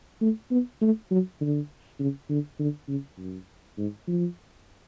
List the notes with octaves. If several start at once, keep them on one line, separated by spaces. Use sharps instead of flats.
A3
B3
A3
F#3
D3
C#3
D3
D3
C#3
F#2
G#2
F3